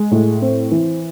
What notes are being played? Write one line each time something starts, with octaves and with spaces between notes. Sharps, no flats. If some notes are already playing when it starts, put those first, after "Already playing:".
Already playing: G#3
A2
C4
E3